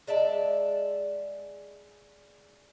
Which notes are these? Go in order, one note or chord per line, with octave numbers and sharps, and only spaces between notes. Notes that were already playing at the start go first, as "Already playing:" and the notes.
G#3 D5 E5 A5